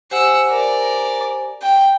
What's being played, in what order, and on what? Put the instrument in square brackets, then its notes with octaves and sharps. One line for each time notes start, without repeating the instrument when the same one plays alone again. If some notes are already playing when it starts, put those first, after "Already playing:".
[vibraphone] G4 C5 G#5 [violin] F#5 E6
[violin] A#4 D5
G5